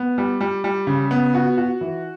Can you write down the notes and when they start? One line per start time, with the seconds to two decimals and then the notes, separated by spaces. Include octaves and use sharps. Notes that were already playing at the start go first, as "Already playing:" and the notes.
Already playing: B3
0.18 G3
0.41 G3
0.64 G3
0.87 C#3
1.11 B3
1.34 F#4
1.58 F#4
1.81 E3